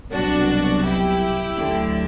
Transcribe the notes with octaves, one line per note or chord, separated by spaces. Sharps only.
C2 B2 F#3 D4 F#4
E4 G4
D2 D3 F#3